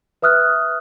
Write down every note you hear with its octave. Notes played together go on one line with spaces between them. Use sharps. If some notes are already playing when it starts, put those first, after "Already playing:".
B4 E5 D#6 F6 F#6